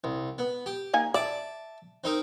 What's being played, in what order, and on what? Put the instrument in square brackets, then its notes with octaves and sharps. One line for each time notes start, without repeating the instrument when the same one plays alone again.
[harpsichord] C2
B3
G4
[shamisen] A#3 D#4 G#5
[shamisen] D5 [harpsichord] E5 A5 D6
[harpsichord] C4 D#4 A#4